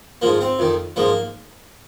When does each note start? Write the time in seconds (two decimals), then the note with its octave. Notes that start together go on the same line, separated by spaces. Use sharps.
0.22 G#2 F3 A#3
0.41 C4
0.59 F2 D#3
0.96 G#2 F3 A#3